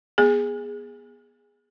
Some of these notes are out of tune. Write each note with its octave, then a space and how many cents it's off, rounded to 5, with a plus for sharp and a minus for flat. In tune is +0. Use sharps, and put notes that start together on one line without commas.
B3 -20 G#4 -10